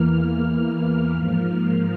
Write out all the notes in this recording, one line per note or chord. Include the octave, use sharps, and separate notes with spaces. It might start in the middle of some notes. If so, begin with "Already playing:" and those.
Already playing: E2 E3 A#3 F6
G#2 F3 A#3 F6
F6